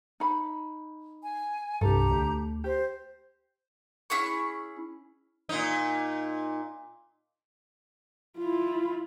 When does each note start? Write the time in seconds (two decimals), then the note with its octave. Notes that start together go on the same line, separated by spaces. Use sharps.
0.20 D#4 B5
1.25 G#5
1.81 C2 G2 G4 A4 A#5
2.10 D2
2.64 G4 C5
4.10 C#4 E4 G#4 C#6
5.49 A#2 D#4
8.39 E4 F4